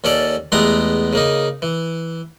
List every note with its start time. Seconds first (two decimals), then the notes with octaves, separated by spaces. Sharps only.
0.04 D#2 C#4 A4 D5
0.52 E2 G#3 A3 B3 G4 A#5
1.13 C#3 A#3 D#4
1.62 E3